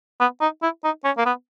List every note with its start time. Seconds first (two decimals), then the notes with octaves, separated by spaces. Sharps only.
0.20 B3
0.41 D#4
0.62 E4
0.84 D#4
1.05 C#4
1.18 A#3
1.26 B3